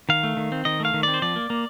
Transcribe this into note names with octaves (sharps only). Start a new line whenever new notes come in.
D#3 F5
A3
D#3
C4
D#3 D#5
A3 F5
D#3
C4 D5
C5
F3 D5
A#3
A#3